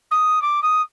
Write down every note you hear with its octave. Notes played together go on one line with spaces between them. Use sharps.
D#6
D6
D#6